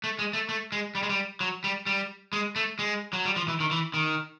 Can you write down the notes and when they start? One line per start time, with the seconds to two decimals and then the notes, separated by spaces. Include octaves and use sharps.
0.04 A3
0.19 G#3
0.33 A3
0.49 A3
0.72 G#3
0.95 G3
1.03 G#3
1.09 G3
1.40 F#3
1.64 G3
1.86 G3
2.33 G#3
2.56 A3
2.79 G#3
3.13 F#3
3.25 G3
3.36 F3
3.48 E3
3.60 D#3
3.71 E3
3.94 D#3